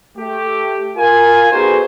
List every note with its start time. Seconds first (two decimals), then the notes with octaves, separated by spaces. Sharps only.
0.17 A3 G4
0.97 F4 A#4 G#5
1.52 B3 D#4 F#4 G#4 A4 C5